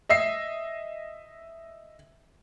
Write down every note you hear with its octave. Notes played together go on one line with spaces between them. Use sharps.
D#5 E5 C7